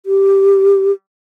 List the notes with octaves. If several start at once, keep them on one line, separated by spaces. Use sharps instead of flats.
G4